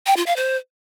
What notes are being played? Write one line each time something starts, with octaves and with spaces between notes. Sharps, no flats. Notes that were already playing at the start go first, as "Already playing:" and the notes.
G5
F4
F5
C5